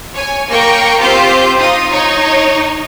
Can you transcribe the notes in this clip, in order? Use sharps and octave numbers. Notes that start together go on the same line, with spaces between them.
C#5 G#5
A#3 A#4 G5 C#6 C#7
C4 F4 G4 C5 G6
D#4 F4 D#6
D#4 C#5 C#6